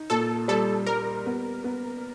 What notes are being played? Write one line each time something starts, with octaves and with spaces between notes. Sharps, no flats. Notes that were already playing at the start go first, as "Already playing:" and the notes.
Already playing: D#4
A#2 A4
G3 A4
G3 A#4
B3
B3